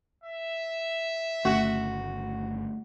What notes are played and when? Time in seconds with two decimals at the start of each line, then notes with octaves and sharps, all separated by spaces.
0.24 E5
1.45 G1 C#3 A3 F#4